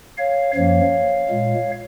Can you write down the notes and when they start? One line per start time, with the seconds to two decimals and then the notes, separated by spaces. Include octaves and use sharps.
0.18 C#5 F5
0.55 F#2 F3 A#3 C#5 F5
1.29 A#2 G#3